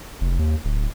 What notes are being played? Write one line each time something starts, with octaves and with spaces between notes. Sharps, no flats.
F1
D#2
D1